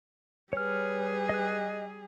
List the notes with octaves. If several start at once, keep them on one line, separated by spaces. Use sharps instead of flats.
G3 G#4 B4 C#5 F6
D#5 F#6